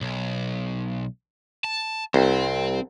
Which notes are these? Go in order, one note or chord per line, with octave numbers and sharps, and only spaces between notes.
B1
A5
C2 C4